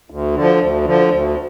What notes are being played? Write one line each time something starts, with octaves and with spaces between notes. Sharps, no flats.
D2
D3 F3
D2
D3 F3
D2